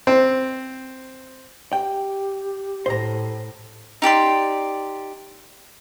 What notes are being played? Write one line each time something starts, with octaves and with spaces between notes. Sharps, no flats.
C4
G4 G5
A2 C5 A#5
D#4 G4 D5 C6